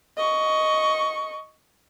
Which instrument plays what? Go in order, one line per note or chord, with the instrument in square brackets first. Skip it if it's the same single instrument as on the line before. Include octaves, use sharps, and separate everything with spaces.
[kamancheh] D#5 C#6